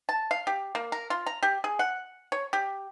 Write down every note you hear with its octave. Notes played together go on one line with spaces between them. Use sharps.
A5
F5
G4
A#3
A#4
F4
A#5
G4
G#4
F#5
C#5
G4